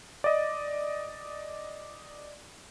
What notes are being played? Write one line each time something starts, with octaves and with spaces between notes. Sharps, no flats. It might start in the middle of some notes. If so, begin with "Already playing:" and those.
D5 D#5